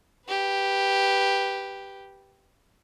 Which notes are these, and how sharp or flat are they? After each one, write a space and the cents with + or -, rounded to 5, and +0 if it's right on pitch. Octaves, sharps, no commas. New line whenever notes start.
G4 +0 B4 +0